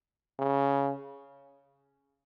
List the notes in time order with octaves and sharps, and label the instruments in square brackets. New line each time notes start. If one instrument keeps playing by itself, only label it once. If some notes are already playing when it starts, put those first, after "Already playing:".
[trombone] C#3